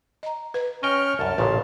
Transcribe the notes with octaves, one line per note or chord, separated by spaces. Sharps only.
D#5 A#5
B4
C#4 D#5 G5 C#6 F6
C2 F#2 A5
A1 A#2 C#3 A#4